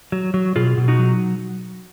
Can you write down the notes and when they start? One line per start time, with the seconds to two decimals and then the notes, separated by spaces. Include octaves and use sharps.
0.12 F#3
0.34 F#3
0.56 B2 F4 G#4
0.78 B2
0.88 D#4 F#4
0.99 F#3